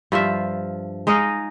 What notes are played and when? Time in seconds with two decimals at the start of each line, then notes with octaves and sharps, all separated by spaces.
0.12 G2 F3 F4 E5
1.07 G#3 D#4 D#5 F5